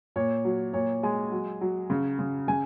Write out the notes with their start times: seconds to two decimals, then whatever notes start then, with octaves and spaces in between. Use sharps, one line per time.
0.16 A#2 C#5
0.45 F#3
0.73 A#2 C#5
1.03 G#3 G#5
1.32 F#3
1.61 F#3
1.90 C#3
2.19 C#3
2.48 C#3 G#5